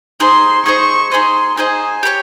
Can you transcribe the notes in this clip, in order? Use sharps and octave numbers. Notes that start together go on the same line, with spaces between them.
D#4 G#4 C5 D#5 C6
D#4 G#4 C5 D#5 C#6
D#4 G#4 C5 D#5 C6
D#4 G#4 C5 D#5 G#5
G4 A#4 C#5